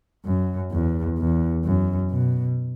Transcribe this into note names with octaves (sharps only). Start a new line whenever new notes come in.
F#2
E2
E2
F#2
B2